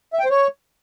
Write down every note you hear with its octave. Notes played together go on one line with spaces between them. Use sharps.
E5
G5
C5
C#5